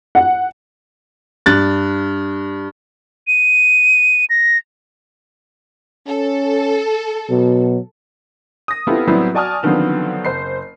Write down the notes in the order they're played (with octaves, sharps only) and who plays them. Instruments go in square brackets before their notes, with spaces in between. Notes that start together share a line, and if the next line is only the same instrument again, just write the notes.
[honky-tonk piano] F#5
[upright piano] G2 F#6 A6
[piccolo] D#7
A#6
[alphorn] C#4 [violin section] A4
[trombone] B2 [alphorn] F#3
[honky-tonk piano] D#6 A#6
B3 C4 E4 F4 G4 A4
A2 F#3 G3 B3 C4 E4
F#4 D5 G#5 A5 D#6 F6
D3 D#3 F3 F#3 B3 C4
F#1 C5 C7